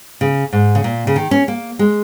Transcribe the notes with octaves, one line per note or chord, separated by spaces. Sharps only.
C#3
G#2
C#3
A#2
C#3
D#3
C#4
A#3
G#3